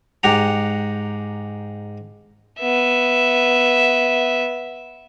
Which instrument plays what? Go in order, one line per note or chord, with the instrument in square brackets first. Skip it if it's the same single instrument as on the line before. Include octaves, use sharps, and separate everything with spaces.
[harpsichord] G#2 G4 F#5 A#5
[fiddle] B3 E5